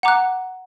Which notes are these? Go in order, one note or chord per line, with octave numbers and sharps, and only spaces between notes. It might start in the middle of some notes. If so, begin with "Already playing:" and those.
F#5 A#5 D6 F#6